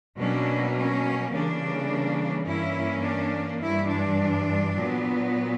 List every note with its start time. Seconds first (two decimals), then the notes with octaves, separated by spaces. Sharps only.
0.19 B2 F#3 A#3 C#4 D4
0.77 C#4
1.33 C#3 E3 G3 A#3 D4
2.48 G2 E3 A#3 C#4 E4
3.05 D4
3.62 G2 E3 G3 E4
3.90 D4
4.76 A#2 F#3 B3